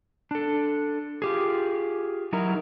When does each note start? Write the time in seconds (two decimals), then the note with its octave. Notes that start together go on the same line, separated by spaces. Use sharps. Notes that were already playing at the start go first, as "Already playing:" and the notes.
0.31 D4 A4
1.22 F4 G4 G#4
2.33 F#3 D#4 E4 A#4